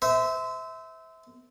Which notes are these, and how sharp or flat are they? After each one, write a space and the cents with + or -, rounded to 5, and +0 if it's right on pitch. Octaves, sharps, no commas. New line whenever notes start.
C5 -30 E5 -20